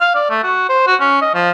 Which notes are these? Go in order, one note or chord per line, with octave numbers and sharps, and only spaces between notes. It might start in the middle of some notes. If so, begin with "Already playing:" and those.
F5
D5
A3
F#4
C5
F#4
C#4
D#5
F3